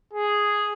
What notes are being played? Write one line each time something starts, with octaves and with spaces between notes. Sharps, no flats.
G#4